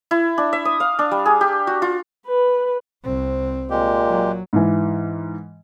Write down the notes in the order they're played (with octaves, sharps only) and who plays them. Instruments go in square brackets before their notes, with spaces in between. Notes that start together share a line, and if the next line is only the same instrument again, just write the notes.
[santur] E4
D4
E5
D#6
F5
D4
G3
G#4
G4
F#4
F4
[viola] B4
[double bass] C2 C4
[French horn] A#2 [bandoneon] G#3 G4
[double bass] F#3
[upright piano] G#2 E3